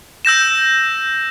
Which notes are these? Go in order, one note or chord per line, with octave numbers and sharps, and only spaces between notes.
E6 G6 A#6 E7